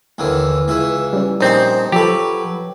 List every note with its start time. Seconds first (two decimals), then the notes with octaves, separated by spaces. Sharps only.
0.18 D#2 D3 E3
0.68 C#2 E3 E5
1.13 G3 C#4
1.41 A#1 C4 D#4 G4 C5
1.92 F3 F#3 G4 A4 B4